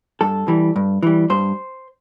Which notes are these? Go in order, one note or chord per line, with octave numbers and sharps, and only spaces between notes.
G2 A4
E3 G3
G2
E3 G3
G2 C5